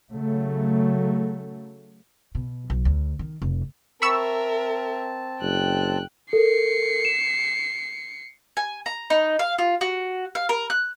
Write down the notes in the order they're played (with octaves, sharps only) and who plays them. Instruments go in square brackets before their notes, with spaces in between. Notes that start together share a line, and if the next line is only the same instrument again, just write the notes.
[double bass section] C#3 F#3 A3
[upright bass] B2
B1
D2
D#3
F1
[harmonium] C4 A5 [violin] A#4 E5 [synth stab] B5 C#6 E6
[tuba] F#1 [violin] G5 F#6
[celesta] A4 A#4 [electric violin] C7 C#7
[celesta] E7
[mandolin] G#5
A#5
D#4
F5
F4
F#4
F5
A#4
F#6